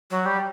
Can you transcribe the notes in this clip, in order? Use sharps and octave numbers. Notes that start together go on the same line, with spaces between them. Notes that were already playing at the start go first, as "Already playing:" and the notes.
F#3
G3